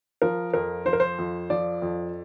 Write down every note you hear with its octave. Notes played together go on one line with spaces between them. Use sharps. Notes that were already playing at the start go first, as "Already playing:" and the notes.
F3 A#4
F2 A#4
F3 C5
A#4
C5
F2
F3 D5
F2